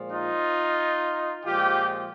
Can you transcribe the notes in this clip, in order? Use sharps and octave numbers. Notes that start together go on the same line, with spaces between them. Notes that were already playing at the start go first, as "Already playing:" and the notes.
Already playing: A#2 F3 G#3
D#4 F4
A#2 F3 G#3 F4 G4